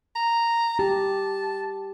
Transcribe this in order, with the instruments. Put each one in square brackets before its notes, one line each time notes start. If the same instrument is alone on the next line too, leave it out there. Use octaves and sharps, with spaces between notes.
[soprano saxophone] A#5
[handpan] G4 [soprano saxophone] A5